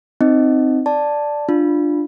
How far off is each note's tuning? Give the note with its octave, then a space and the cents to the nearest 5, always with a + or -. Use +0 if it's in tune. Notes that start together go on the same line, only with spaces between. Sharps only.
C4 +0 D#4 +0 D#5 +0
D5 +0 A5 +0
D4 +15 F4 +0